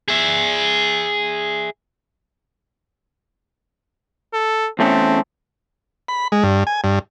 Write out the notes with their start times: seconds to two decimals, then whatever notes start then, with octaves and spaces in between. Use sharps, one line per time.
0.08 G#4 E5
4.33 A4
4.79 E2 A3 C4 C#4
6.08 B5
6.32 G#3
6.43 G2
6.67 G#5
6.84 G2